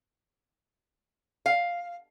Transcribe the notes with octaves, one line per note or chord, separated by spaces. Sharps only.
F5